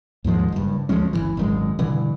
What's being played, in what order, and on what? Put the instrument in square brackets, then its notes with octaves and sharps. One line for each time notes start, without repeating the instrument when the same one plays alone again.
[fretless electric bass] D#2 G#2 F3 G#3
F#1 G2
D2 F3 G#3 C#4
G1 F#2 E3
G#1 F#2 G#3
G2 B2 D3 E3